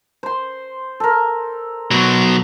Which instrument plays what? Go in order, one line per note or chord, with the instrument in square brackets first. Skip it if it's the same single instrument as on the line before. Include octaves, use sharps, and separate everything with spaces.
[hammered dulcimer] C5 C6
A4 A#4
[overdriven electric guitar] B2 F#3 [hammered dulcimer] C#5 C6